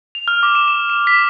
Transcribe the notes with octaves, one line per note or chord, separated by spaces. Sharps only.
F7
F6
D6
E7
E7
E7
B6